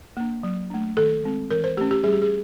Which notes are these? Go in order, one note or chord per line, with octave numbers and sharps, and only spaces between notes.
A#3 D4
F#3
A3 D4
D#3 A4
G#3 C4
E3 A#4
C5
A3 C#4 G4
G4
G3 G#4
G4
G#4